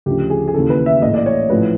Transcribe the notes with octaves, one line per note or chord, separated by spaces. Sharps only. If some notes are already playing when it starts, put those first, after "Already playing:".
D2 C#3 F3 G4
G#4
G#4
D#2 C#3 E3 A4
B4
E5
A#1 A2 E3 D#5
D5
C#5
A1 A2 F3 B4